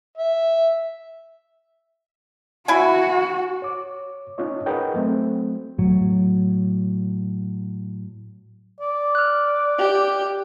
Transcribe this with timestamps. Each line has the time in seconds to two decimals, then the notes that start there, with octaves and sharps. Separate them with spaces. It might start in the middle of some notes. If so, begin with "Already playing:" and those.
0.17 E5
2.68 E4 F#4 G#5
3.62 C#5 D6
4.38 C#4 D#4 F4 C#5 D#5
4.66 G#4 A#4 B4 D#5 F#5 G5
4.94 F#3 A3 C4
5.78 A2 F#3
8.80 D5
9.15 F6 F#6
9.78 G4